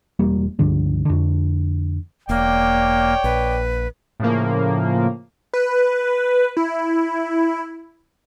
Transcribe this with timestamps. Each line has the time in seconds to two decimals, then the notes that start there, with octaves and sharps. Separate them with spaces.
0.19 E1 G3 A#3
0.59 C#2 G2 D3 F3
1.05 F2 D3
2.29 E1 A#3 C#5 D5 G5
3.24 A#1 B4
4.20 A2 C#3 F3 A#3
5.53 B4
6.57 E4